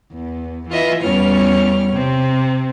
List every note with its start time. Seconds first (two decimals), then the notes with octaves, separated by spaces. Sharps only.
0.12 E2
0.69 E3 F4 D#5 E5
1.03 E2 G3 C#4 C#5 F6
1.94 C3 C4